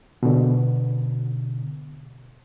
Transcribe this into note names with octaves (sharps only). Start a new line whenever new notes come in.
B2 D3